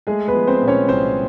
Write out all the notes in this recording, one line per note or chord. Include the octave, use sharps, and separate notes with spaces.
G#3 A3 G#4
B3 B4
F3
C4 C5
A#2
C#4 C#5
C2 C4 C5